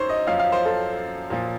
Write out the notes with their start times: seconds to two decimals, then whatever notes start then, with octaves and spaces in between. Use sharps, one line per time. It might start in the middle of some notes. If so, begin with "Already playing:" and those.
Already playing: F#2 D#3 C5 C#5
0.09 D#5
0.27 F#2 F3 F5
0.39 F5
0.52 C5
0.65 A4
1.30 A#2 F3